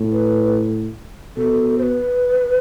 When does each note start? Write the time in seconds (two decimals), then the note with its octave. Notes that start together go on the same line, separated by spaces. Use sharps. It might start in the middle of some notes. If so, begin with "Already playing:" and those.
Already playing: A2
0.12 B4
1.37 B2 A4
1.78 C5
1.83 B4